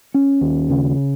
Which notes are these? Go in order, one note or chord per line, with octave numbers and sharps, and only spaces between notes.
C#4
D#2
C#3